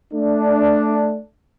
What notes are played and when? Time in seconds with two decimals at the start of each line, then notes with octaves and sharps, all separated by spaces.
0.14 A3 D4